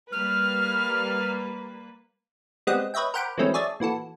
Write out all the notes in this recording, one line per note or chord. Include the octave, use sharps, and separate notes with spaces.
G3 A#3 B4 F6
G3 G#3 B3 C4 D#5 F#5
B4 C#5 D#5 E5 G5
A#4 C5 F#5 G5 B5 D6
E3 F#3 G#3 A3 C4 C#4
G#4 C#5 D5 E5 A5
A#2 E3 F#4 A4